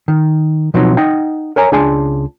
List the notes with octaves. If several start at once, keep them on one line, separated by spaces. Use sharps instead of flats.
D#3
B2 F3 F#3 C4 D#4
D#4 D#5 F#5 G5
A#4 C#5 G#5 A#5
C#2 D4 G#4 G#5 A5 C6